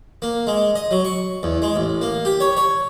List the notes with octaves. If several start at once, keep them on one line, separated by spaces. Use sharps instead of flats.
A#3
G#3
D#5
F#3
C#6
E2
G#3
A1
A#3
G4
C#5
C#5